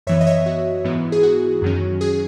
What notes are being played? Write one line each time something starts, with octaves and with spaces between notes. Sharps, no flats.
F#2 E3 B3 C#5 E5
D#5
C#5 E5
F#4
G#2 E3 B3 E4
G#4
F#4
F#2 D#3 F#3 C#4
G#4